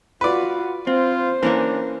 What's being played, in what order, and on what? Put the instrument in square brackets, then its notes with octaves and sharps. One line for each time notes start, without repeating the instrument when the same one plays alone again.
[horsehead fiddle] F4 F#4 [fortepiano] B4 D5
[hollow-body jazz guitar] C4 [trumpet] F4 [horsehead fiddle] C5
[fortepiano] E3 [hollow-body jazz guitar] A#3 C#4 A#4 [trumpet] D4